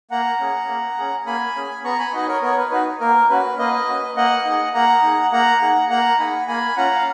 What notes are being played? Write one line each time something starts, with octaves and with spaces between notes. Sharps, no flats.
A#3 F#5 A#5
C#4 G#4
A#3
C#4 G#4
A#3 G#5 B5
C#4 G#4
B3 A#5 C#6
G#5 B5
D#4 F#4 B4 D#5
A#4 C#5
B3 A#4 C#5
B4
D#4 F#4 B4
A#3 A#4
C#4 F#4 B4
A#3 B4 D#5
C#4 F#4
A#3 D#5 F#5
D#4 G#4
A#3 F#5 A#5
D#4 G#4
A#3 F#5 A#5
D#4 G#4
A#3 F#5 A#5
D#4 G#4 G#5 B5
A#3 G#5 B5
C#4 F4 F#5 A#5
F5